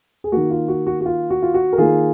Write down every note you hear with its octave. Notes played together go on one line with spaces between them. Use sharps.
G#4
D#3 A#3 F#4
F4
F#4
F#4
F#4
F4
F#4
F4
F#4
A#4
D#3 A#3 F4 G#4